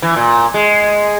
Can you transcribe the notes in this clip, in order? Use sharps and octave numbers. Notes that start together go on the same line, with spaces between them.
E3
A#2
G#3